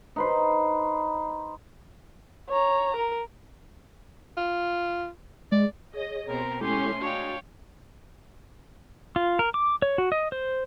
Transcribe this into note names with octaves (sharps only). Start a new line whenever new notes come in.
D#4 B4 C5
C#5 A#5
A#4
F4
G#3 D5
G#4 C#5 D#5
B2 C4 A#4 A#5
G#3 A3 C#4 E4 G4 A4 C6
G#3 D4 F#4 C#5 F5 G5
F4
A#4
D6
C#5
F#4
D#5
C5